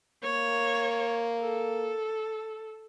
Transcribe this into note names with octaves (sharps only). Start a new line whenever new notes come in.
A#3 C#5
A4